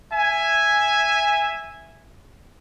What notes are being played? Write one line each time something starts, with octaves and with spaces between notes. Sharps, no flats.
E5 G#5